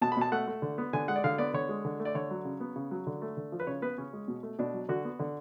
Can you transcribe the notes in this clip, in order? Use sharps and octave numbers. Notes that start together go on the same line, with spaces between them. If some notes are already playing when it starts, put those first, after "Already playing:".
B2 A5
B5
B2 A5
A3 F#5
A3
D3
B3
D3 G#5
G#3 F#5
D5
D3 F5
B3 D5
D3 C#5
G#3
D3
A3
D5
D3 C#5
F#3
C#3
B3
C#3
F#3
D3
A3
D3
F3
B4
C#3 C#5
B3 B4
C#3 C#4
G#3
B2
A3
B2 D4
F#3
D3 F#4
B3
D3